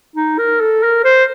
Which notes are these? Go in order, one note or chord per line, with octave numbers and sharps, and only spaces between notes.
D#4
A#4
A4
A#4
C5